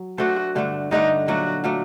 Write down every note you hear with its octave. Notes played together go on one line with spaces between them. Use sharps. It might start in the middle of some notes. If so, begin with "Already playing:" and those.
Already playing: F#3
A3 D4 F#4 A4 C5
G2 D3 A3 D4
G2 D3 A3 D4 D#4
A#2 F#3 A3 D4 F#4
A#2 F#3 A3 D4